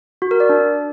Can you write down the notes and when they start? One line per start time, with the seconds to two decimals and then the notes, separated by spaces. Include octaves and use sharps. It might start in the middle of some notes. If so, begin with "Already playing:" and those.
0.22 F#4
0.31 A#4
0.40 D5
0.49 D4